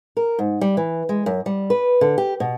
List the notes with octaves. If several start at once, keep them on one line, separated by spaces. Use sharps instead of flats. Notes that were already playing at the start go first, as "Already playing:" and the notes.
A#4
G#2
G3
E3
G#3
F#2
G3
B4
D3
G4
B2